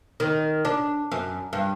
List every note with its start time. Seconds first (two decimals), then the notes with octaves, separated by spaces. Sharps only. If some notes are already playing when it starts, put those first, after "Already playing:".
0.20 D#3
0.65 D4
1.12 F#2
1.53 G2